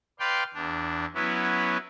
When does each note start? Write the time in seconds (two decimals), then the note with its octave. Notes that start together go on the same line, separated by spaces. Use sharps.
0.20 B4 D5 F5 G5 C6
0.54 E2 D4
1.14 F#3 B3 C#4 E4